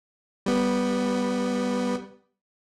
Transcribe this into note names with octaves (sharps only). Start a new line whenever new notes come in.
G3 B3